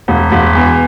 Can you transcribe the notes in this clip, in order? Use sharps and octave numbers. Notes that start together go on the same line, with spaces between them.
E1
E1
E2